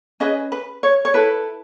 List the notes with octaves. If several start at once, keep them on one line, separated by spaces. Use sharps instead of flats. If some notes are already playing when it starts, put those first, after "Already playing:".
C#4 G#4 B4 D#5
B4
C#5
C#5
E4 A4 B4